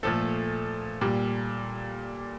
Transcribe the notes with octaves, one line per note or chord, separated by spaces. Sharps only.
A#2 F3 A3 A4
A#2 G3